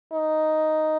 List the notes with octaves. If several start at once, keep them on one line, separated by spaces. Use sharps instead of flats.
D#4